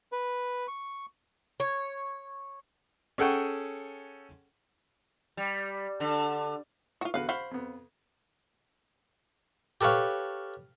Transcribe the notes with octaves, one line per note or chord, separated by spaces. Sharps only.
B4
C#6
C#5
C#4 G#4 A4 F#5 G5 C#6
G3
D3
F4 F#4 C#6
E2 D3 F#4 B4 F5
C5 F5 F#5 B5 C#6
F2 B3
G4 A4 B4 C#5 F5